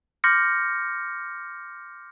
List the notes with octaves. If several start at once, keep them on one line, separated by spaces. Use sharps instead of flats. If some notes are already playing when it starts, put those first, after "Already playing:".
C6 D6 F6 G6 A#6 C#7